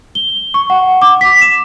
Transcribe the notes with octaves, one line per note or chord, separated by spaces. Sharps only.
G7
C#6
F#5
D6
B6
E7